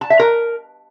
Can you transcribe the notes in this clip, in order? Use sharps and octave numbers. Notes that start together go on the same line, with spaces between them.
A5
E5
A#4